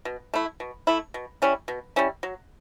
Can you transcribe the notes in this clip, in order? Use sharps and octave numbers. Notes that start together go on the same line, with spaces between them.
B2
A3 E4
B2
A3 E4
B2
G3 C#4 E4
B2
G3 C#4 E4
F#3